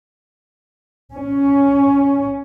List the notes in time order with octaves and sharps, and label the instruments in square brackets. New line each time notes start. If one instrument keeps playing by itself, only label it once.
[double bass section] C#4